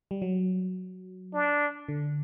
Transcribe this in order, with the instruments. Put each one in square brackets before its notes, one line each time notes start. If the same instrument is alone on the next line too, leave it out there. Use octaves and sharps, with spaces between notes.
[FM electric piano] G3
F#3
[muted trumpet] D4
[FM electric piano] D3